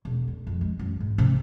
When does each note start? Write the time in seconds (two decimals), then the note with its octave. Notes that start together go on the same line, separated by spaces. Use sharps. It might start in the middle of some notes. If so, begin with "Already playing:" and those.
0.05 E1
0.28 D3
0.47 F2
0.61 G#3
0.79 F#2
1.00 G#2
1.18 C3